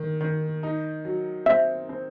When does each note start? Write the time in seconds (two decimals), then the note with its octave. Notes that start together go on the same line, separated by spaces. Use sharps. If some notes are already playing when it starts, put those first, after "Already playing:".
Already playing: D#3
0.21 D#3
0.63 D#4
1.05 F#3
1.46 C4 E5
1.89 C4